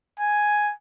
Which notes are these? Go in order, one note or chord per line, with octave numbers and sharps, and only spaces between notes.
G#5